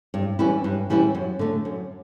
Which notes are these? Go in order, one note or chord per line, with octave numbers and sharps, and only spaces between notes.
G2
E3 G3 C#4 E4
G2
E3 G3 C#4 E4
F#2
D3 A3
F#2